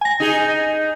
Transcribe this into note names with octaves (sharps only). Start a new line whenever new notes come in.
G#5 A#6
D#4 G#4